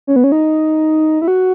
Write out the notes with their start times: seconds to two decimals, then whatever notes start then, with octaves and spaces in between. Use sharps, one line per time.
0.07 C#4
0.16 B3
0.24 C#4
0.32 D#4
1.22 E4
1.28 F#4